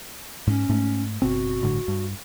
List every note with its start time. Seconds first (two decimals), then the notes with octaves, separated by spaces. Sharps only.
0.47 G#2 C#4
0.69 G#2 A3
1.22 F#1 B2 C4 F#4
1.61 G1 A2 D3
1.88 G2